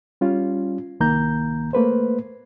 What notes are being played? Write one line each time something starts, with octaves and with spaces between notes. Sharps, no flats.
G3 C#4 F4
C2 D#3 A#3 A#5 G6
A3 A#3 B4 C5